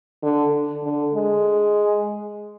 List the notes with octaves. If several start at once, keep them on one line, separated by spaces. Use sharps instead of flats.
D3
D3
G#3